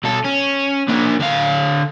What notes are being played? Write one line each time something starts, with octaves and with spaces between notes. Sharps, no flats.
B2 A4
C#4
A#3 D4
D3 F5